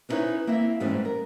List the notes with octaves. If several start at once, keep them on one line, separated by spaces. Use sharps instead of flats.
B3 C#4 D#4 E4 B4 C#5
A#3 C4 E4 E5
G#2 E3 G3 A3 B3 C#4
A#4